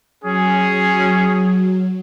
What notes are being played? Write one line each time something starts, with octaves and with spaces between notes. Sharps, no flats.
F#3 C#4 G#4